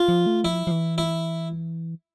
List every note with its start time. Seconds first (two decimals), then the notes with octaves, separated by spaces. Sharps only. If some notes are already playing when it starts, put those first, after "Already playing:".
Already playing: F4
0.08 F3
0.26 A3
0.44 F3 E4
0.67 F3
0.71 E3
0.98 E4